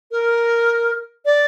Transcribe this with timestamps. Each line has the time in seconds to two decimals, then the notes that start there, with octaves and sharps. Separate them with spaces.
0.12 A#4
1.26 D5